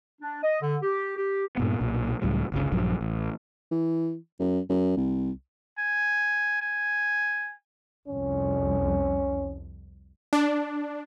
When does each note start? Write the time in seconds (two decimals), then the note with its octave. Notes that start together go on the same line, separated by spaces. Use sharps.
0.21 D4
0.43 D#5
0.61 D3
0.83 G4
1.16 G4
1.57 G2 A#2 B3
1.80 B1 A#2
2.22 C#2 A2 F#3 G3
2.52 G1 C#2 A#2 C#3
2.72 A#1 G2 F3 F#3
3.01 A1
3.71 E3
4.40 F#2
4.69 F#2
4.97 C2
5.78 G#5
6.62 G#5
8.08 C2 F2 C#4
10.33 D4